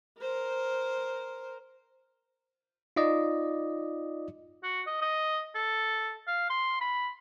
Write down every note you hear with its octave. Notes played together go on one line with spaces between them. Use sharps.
A#4 C5
D#4 F4 D5 D#5
F#4
D#5
D#5
A4
F5
C6
B5